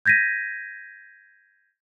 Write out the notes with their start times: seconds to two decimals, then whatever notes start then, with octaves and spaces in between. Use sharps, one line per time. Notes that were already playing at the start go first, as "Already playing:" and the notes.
0.06 G6 G#6 A#6 B6 D#7